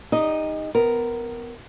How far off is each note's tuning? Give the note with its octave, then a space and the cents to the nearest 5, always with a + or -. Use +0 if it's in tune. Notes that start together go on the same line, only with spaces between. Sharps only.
D#4 +0 G4 +45 D#5 +0
B3 +20 A#4 +0